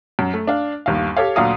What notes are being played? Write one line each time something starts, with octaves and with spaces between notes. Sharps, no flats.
F#2
A3
D4 F5
G1 D#2 F5
G4 A4 C#5 F5
D2 A#2 F#3 F5 A#5 D#6